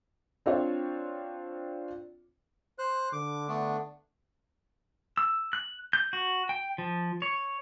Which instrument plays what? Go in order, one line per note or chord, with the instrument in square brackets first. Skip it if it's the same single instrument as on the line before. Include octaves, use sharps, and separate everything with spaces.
[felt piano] C4 D4 F4 C#5
[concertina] C5 F#6
[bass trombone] D3 [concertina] D6
[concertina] A3 B3 D4
[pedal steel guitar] E6
F#6
G6
F#4
G5
F3
C#5